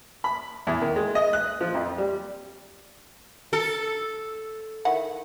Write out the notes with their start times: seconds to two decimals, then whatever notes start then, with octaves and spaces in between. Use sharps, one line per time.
0.24 B5
0.67 E2
0.82 D#3
0.96 G#3
1.15 D#5
1.33 F#6
1.61 F3
1.75 F2
1.98 G3
3.53 A4
4.85 D#3 E4 F#5